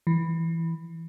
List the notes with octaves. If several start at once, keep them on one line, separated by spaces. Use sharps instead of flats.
E3